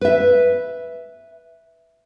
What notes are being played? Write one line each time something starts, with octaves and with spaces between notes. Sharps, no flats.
B4 E5